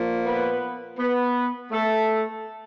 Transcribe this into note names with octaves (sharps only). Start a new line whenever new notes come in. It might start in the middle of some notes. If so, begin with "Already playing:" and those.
Already playing: A#2 F3
B3 B4
B3 B4
A3 A4